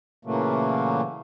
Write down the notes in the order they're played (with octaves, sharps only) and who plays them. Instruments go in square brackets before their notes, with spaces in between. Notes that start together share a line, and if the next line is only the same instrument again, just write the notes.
[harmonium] A#2 C#3 E3 F#3 A3 A#3